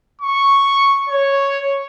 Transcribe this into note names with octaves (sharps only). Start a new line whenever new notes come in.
C#6
C#5